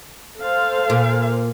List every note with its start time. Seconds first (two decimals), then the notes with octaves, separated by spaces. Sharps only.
0.39 A4 C5 F5
0.90 A#2